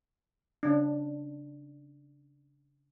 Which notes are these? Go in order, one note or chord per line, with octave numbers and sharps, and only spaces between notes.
C#3 D4